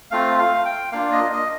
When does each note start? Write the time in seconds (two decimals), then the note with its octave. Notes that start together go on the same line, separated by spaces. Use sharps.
0.11 A3 C4 F4 F5
0.39 F5
0.65 G5
0.92 A#3 D4 F4 F5
1.12 D#5
1.32 D#5